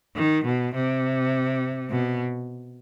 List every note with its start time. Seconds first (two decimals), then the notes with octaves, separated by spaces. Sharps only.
0.16 D#3
0.45 B2
0.75 C3
1.90 B2